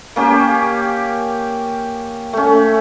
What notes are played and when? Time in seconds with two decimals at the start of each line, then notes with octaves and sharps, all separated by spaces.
0.16 A#3 C#4 G4
2.33 A3 C#4